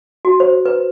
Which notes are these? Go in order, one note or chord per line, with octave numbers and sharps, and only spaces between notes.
F#4
C5
B4